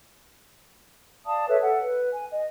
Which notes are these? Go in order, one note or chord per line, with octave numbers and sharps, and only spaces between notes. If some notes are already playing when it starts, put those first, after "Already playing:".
D5 F5 A5 D#6
A4 B4 C#5 E5
A4 F#5
B4
G#5
D#5